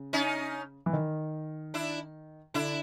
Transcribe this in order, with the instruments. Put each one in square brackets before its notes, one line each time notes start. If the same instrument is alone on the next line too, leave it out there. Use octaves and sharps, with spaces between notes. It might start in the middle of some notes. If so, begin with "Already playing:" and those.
Already playing: [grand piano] C#3
[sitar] C#4 D#4
[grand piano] E3
D#3
[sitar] D4 E4
[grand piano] D3 [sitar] D4 E4